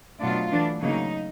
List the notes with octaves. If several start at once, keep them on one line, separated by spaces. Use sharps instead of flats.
B2 F#3 A3 D4 F4
E3 A3 D4
C#3 F#3 A#3 D#4